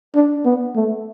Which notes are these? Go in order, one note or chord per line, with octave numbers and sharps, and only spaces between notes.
D4
B3
A3